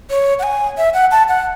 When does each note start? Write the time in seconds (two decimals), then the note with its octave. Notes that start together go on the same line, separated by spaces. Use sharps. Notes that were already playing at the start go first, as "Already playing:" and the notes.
0.10 C#5
0.39 F#5
0.43 G#5
0.78 E5
0.94 F#5
1.11 A5
1.28 F#5